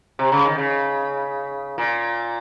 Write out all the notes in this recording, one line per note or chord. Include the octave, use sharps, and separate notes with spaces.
C3
C#3
D#3
C#3
A#2